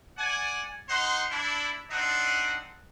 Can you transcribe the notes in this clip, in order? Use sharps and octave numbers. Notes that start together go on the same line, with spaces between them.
D5 F#5 G#5
D#4 C5 F#5 C6
D4 E4
C4 D4 D#4 E5 F#5